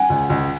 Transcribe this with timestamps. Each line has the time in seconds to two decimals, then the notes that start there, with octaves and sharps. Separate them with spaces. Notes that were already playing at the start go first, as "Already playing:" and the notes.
Already playing: F#5 G#5
0.10 C#2
0.30 C#2